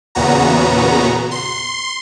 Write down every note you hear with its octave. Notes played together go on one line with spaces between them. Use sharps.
E2 A#2 C#3 B3 F#4 A#5
C6